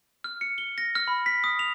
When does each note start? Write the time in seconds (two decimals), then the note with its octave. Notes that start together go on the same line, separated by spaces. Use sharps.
0.24 F6
0.41 C#7
0.58 G7
0.78 A#6
0.95 F6
1.08 B5
1.26 B6
1.44 D#6
1.59 F7